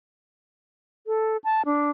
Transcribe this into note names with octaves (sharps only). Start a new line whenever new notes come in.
A4
A5
D4